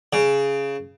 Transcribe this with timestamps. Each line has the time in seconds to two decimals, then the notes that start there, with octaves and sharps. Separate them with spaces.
0.13 C#3